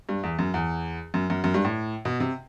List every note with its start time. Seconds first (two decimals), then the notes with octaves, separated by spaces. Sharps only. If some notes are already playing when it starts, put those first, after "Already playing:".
0.09 G2
0.23 E2
0.39 F#2
0.54 E2
1.14 F#2
1.30 F#2
1.44 F#2
1.54 G2
1.65 A2
2.05 B2
2.20 C3